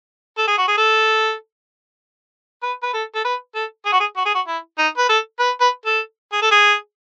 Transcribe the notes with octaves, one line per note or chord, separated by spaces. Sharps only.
A4
G#4
F#4
G#4
A4
B4
B4
A4
A4
B4
A4
G#4
F#4
G#4
F#4
G#4
F#4
E4
D#4
B4
A4
B4
B4
A4
G#4
A4
G#4